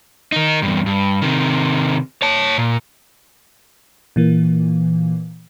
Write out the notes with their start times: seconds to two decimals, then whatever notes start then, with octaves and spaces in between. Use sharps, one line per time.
0.32 D#3 D#4
0.62 E2 G2
0.86 G2
1.22 C3 D#3
2.22 C#5 A5
2.58 A#2
4.16 A#2 E3 A#3